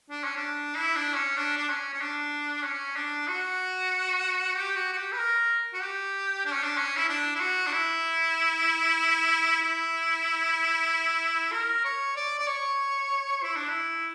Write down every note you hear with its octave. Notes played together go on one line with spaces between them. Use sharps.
D4
C#4
D4
E4
D4
C#4
D4
D4
C#4
C#4
D4
C#4
D4
F#4
G4
F#4
F#4
G4
B4
A#4
F#4
G4
D4
C#4
D4
C#4
E4
D4
E4
F#4
D4
E4
E4
A#4
C#5
D5
D5
C#5
E4
D4
E4